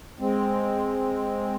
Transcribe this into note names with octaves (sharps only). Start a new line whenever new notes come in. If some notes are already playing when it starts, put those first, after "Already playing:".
G#3 C4